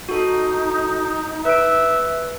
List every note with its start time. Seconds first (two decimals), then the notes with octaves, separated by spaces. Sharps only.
0.09 D#4 F#4 A4
1.45 B4 E5 D7